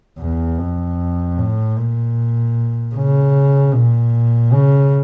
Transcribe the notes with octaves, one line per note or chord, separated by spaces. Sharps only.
E2
F2
A2
A#2
C#3
A#2
C#3